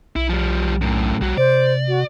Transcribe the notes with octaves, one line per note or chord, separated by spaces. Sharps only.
B1 E4
F3 G3
F#2 A2
B1 G3 F#4
C3 C5 D5
F#4